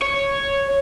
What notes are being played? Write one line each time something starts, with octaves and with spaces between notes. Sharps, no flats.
C#5